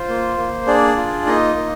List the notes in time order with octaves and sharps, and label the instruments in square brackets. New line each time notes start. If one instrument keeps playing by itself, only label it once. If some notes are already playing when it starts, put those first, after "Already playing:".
Already playing: [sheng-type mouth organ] F4 C5
A#3
A#3
D4 G#4 D5
F4
A#3 D#4 D#5
A#3